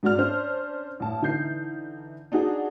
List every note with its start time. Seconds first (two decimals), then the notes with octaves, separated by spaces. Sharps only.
0.03 G#2 G#3 F#4 D5 F6
0.18 C#4 D4 C5
1.00 A1 A5
1.21 D3 E3 D#4 G6 C7
2.32 D4 D#4 F#4 G#4